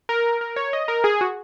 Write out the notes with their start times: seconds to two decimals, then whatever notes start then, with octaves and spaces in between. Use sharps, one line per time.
0.09 A#4
0.41 A#4
0.56 C#5
0.73 D#5
0.88 A#4
1.04 G#4
1.21 F#4